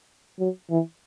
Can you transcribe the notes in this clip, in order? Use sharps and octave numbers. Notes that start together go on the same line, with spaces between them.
F#3
E3